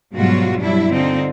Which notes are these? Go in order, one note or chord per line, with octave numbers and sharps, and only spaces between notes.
G#2 B2 F#3 G3 F4 F#4
G2 F#3 G3 D4 E4
D3 C4 D#4 F4